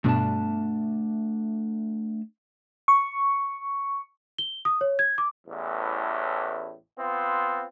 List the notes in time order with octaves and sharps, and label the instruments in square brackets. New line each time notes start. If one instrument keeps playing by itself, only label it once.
[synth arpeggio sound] G2 B2 [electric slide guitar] A3 D4 A5
[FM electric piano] C#6
[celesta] G7
D#6
C#5
G#6
D6
[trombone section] A1 E2 A2
B3 C4 F4